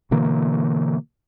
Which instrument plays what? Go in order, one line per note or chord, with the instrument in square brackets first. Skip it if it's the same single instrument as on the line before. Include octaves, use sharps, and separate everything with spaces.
[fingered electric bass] B2 D3 E3 A#3